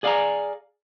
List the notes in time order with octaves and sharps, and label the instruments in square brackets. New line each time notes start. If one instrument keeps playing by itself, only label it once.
[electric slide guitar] G#4 D5 F5 G5 G#5 A#5